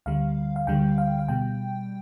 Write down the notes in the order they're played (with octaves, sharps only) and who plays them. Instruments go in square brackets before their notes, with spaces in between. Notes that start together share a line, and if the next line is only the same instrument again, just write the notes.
[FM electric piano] D2 D3 G3 F5
F5
D2 D3 G3 G5
F5
F5
B2 G3 G5